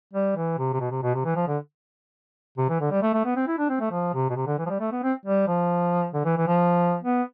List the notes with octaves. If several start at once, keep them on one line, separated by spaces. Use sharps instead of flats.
G3
E3
C3
C3
B2
C3
B2
C3
E3
F3
D3
C3
E3
D3
G3
A3
A3
B3
C4
E4
D4
C4
A3
F3
C3
B2
C3
D3
E3
F3
G3
A3
B3
C4
G3
F3
D3
E3
E3
F3
B3